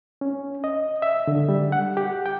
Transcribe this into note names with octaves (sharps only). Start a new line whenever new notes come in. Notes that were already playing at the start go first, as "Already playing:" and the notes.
C#4
D#5
E5
D3
G3
F#5
G4
G5